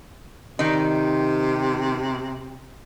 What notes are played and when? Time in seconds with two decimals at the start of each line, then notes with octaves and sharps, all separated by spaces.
0.59 C3 D#3 D#4